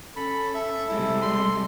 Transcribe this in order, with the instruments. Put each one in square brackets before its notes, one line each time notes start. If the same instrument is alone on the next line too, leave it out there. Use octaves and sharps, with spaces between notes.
[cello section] C#4 [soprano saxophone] A4 [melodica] B5
[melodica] A4 [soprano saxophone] E5
[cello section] C3 G3 G#3 [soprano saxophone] E4
[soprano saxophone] C6